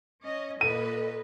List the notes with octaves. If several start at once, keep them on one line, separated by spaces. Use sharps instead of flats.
C#4 D#5
A#2 A4 B4 D#5 D#7